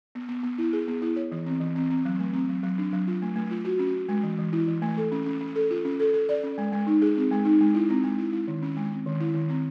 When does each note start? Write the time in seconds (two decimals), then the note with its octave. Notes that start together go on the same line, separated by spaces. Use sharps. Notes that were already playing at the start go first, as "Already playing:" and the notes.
0.15 B3
0.29 B3
0.43 B3
0.58 E4
0.73 G#4
0.88 B3
1.02 E4
1.16 C#5
1.32 E3
1.46 C4
1.61 E3
1.75 C4
1.90 C4
2.05 F#3
2.19 A3
2.34 C4
2.49 F#3
2.63 F#3
2.78 D4
2.93 F#3
3.07 F4
3.22 A3
3.36 A3
3.51 F4
3.65 F#4
3.79 C#4
3.95 C#4
4.09 G#3
4.24 E3
4.38 E3
4.53 E4
4.68 E3
4.82 A3
4.97 A4
5.12 C#4
5.26 C#4
5.41 C#4
5.56 A4
5.71 F4
5.85 C#4
6.00 A4
6.14 A4
6.29 D5
6.44 C#4
6.58 G#3
6.72 G#3
6.87 D#4
7.02 G#4
7.17 C4
7.31 G#3
7.45 D#4
7.61 G#3
7.74 E4
7.90 C4
8.04 G#3
8.19 E4
8.33 E4
8.48 D#3
8.62 C#4
8.77 G#3
8.92 C4
9.06 D#3
9.20 E4
9.35 D#3
9.49 C4